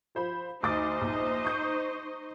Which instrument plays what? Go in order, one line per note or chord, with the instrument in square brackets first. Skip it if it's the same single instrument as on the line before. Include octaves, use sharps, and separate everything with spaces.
[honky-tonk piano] F3 C5 B5
[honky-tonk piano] D2 D6 A6 [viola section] D#4 C5 D#5
[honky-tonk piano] A#1
C#6 D#6 G6